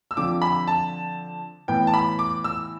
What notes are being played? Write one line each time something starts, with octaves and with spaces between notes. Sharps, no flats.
E6
D3 F3 C4 D6
B5
A5
A2 E3 B3 G5
A5
B5
D6
E6